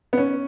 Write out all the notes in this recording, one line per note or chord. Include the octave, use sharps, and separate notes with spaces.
B3
C#4